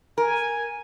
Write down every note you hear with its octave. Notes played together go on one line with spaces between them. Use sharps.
A#4 G#5